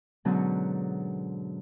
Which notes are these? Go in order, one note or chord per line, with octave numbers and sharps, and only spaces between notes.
G#2 B2 D3 F#3 C#4